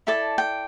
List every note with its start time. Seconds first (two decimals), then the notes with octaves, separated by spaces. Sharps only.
0.07 E4 A4 D5 A5
0.38 G5